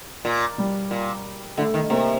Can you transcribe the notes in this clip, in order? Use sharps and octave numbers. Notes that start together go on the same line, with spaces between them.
A#2
G3
A#2
D3 A3
D#3
C3 A#3